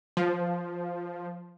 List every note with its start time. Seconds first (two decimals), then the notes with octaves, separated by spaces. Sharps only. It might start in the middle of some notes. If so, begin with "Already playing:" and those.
0.17 F3